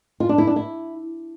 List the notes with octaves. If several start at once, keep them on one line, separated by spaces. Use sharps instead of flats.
F4
D4
E4
D4
E4